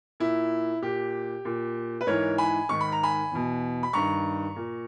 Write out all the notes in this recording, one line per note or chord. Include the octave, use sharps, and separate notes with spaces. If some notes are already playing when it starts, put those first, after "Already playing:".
A#2 E4
A#2 G4
A#2
B4
G#2 E3 A#4 C#5
G#5 B5
G#2 D#3 C#6
B5
A#5
G#5 B5
E2 B2
B5
G2 D#3 A#5 C#6
A#2